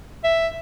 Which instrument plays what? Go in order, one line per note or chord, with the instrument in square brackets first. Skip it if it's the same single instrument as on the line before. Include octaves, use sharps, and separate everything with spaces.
[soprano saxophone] E5